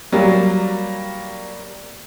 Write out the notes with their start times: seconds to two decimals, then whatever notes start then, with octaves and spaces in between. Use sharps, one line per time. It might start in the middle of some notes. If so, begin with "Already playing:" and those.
0.12 F#3 G3 A#3